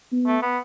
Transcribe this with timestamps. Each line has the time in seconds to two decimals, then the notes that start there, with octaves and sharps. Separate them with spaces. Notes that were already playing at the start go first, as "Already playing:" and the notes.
0.12 B3
0.27 A3
0.42 B3